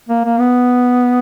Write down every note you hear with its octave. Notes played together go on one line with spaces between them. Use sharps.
A#3
A#3
B3